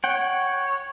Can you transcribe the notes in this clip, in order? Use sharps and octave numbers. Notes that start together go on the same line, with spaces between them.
C#5 F#5 G5